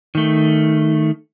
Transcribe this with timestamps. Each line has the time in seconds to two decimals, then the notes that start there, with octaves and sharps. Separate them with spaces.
0.15 D#3 A3